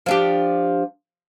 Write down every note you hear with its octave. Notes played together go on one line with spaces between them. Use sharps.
F3 D4 G4